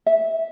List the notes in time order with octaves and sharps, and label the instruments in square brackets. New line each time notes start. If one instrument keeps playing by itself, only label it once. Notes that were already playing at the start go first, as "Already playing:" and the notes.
[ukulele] E5